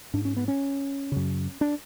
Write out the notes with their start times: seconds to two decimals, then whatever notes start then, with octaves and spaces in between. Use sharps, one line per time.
0.14 G#2 D4
0.25 C#4
0.37 B3
0.48 C#4
1.12 F#2 C#3
1.61 D4